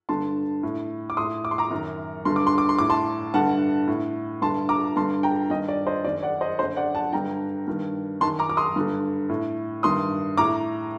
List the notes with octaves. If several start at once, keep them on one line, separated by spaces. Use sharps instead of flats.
G2 D3 A5 C6
A2
D6
A2 C6 D#6
D6
C6
A#5 D6
F#2 D#3
G2 D3 C6
D6
C6
D6
C6
A2 D6
A5 C6
G2 D3 F#5 A5
A2
G2 D3 A5 C6
A#5 D6
G2 D3 A5 C6
G5 A#5
G2 D#3 D#5 G5
D5
C5 D#5
F#2 D#3 D5
D5 F#5
C5 D#5
F#2 D3 C5 D#5
D5 F#5
F#5 A5
G2 D3 G5 A#5
G2 D#3
F#2 D#3 A5 C6
A#5 D6
D6
C6 D#6
G2 D3
A2
G2 D#3 C6 D#6
A2 A#5 D6